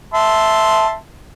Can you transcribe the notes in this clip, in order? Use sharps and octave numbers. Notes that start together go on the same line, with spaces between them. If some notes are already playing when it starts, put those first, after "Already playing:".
E5 A5 C6